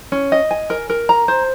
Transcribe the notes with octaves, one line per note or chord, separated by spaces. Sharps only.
C#4
D#5
G#5
A#4
A#4
A#5
C5